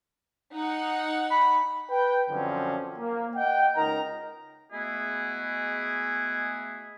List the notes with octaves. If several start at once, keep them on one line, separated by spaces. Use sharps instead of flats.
D#4 F#5
B5
B4 G5
F#2 D3 F3 C4 C#4
A#3
D#5 F#5 G5
C#2 D#4 A#4 A#5
G#3 A3 B3 E4 F#4 G#4